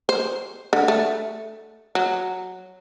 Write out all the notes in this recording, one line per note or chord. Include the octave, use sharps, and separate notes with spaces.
C5
D3
A3
F#3